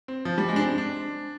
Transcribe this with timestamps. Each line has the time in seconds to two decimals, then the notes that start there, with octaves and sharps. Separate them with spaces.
0.08 C4
0.25 F3
0.38 G3
0.48 G#3
0.56 D4
0.60 C4
0.78 D4